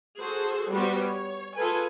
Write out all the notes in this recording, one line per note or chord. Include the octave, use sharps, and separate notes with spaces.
F#4 G#4 A4 C5
G3 B3 F#4 G4 C5
C#5
F4 G#4 A4 B4 G#5